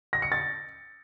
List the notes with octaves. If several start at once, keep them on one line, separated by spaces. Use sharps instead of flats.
A#6
C#7
A6